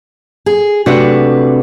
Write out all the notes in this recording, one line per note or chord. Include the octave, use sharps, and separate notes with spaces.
G#4
C3 A3 D4 F#4 B4